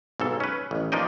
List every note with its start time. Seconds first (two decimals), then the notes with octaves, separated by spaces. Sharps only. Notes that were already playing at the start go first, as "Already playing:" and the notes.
0.20 B1 G#2 A4
0.40 C#4 B4
0.71 A1
0.92 F3 A#3 D4 D#4 D#5 G5